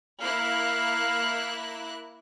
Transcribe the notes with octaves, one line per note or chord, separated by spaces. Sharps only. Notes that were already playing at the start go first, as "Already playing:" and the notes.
A#3 E4 F5 F#6